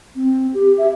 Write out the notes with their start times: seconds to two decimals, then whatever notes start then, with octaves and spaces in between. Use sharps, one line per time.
0.16 C4
0.54 G4
0.78 E5